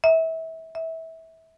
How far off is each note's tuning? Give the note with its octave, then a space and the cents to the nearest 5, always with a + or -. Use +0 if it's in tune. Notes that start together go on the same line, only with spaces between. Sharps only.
E5 -30
E5 -25